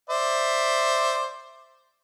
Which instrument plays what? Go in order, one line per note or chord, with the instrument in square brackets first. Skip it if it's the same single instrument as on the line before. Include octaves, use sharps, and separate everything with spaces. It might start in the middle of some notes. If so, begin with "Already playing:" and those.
[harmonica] C5 D5 E5